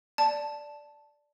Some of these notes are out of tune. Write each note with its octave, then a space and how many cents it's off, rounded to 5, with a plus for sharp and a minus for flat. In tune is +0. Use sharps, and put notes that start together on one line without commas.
D5 +0 A5 +0